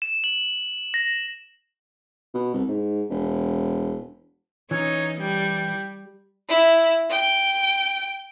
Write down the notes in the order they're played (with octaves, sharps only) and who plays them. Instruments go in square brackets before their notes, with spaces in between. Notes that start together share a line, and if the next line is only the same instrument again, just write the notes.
[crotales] E7
F#7
A#6
[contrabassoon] B2
C2
G#2
E1
[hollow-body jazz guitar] E3 C#4 [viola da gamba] D#4 [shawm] C#5
[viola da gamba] G3 [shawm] G5
[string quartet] E4
G5